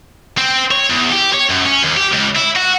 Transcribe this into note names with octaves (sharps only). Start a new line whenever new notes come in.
C4
C#5
E2
G4
C#5
F#2
C#4
D#2
G4
C#2
E4
F#4